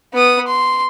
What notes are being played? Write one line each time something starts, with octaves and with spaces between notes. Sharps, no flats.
B3 D#6
C6